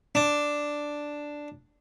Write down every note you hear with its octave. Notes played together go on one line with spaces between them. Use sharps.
D4